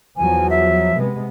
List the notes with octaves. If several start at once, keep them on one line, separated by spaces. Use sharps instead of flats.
E2 F3 F#3 G#5
E5
C3 G#3 B3